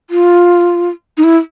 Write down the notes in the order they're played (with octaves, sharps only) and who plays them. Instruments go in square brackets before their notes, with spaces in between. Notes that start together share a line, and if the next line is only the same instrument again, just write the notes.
[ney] F4
D#4
E4